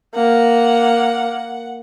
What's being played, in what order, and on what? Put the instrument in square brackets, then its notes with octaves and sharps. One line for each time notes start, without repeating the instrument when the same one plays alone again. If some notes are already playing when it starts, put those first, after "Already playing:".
[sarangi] A#3 [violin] F#5